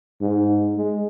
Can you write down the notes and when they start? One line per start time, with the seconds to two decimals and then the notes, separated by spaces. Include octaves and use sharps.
0.22 G#2
0.77 G#3